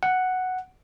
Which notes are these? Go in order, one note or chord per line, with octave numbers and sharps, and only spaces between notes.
F#5